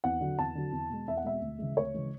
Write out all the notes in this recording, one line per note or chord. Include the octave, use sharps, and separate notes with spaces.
E2 F#5
D3 F#3
E2 A5
D3 F#3
E2
B2 G#3
E2 E5
F#5
B2 G#3 E5
D2
C#3 E3 G#3
D2 C#5
C#3 E3 G#3